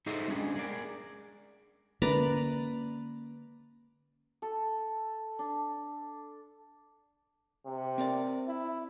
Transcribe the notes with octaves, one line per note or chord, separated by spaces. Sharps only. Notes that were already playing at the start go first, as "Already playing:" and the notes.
D#4 G#4 A4 C5 D#5 E5
G#3 C#4 D4 G#4
G#4 A#4 D5
D3 G#3 A#3 C#4 B4 D5 A#5 D6
A4
D4
C3
C4 A#4 D5
E4